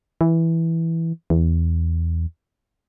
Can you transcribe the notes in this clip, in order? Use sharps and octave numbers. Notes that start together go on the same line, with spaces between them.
E3
E2